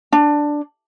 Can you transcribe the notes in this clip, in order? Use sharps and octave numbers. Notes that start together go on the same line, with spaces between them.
D4